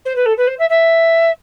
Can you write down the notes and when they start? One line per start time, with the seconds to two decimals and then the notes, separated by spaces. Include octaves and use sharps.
0.05 C5
0.15 B4
0.25 A4
0.37 B4
0.47 C5
0.58 E5
0.69 E5